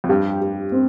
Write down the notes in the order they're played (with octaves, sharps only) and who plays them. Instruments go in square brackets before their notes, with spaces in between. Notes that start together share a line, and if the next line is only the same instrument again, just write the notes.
[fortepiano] F2
[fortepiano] G2 [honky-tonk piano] G4
[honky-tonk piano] G4
C4